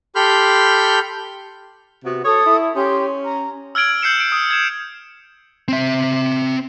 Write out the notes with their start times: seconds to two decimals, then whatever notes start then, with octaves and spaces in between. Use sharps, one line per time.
0.15 G4 A4 B5 C6 F6 G6
2.05 C3 B3 F#4
2.24 A4 C#5 D#6
2.46 E4
2.75 C#4 G4 C6 G6
3.24 A#5
3.75 E6 F6 G#6 D7 F#7
4.02 E6 G6 C7 C#7 E7
4.20 D7
4.32 D#6
4.51 G#6 E7
5.68 C4 E5